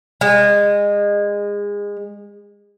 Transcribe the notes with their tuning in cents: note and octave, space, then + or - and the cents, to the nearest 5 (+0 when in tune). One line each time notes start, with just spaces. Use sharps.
G#3 -25